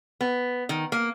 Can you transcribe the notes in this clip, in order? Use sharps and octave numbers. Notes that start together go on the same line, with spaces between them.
B3
D#3
A#3